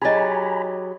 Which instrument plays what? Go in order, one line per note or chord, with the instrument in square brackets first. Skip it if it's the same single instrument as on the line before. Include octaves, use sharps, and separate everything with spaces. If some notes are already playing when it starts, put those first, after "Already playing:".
[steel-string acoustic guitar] F#3 G4 G#4 [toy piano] D#4 D#5 [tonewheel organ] G#5 A#5 B5